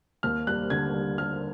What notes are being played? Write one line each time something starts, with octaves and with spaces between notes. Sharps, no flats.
D#2 F6
G3 F#6
D3 G#6
G3
G3 F6